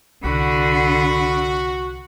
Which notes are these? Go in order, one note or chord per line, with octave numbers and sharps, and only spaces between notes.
C2 D3 F#4 B5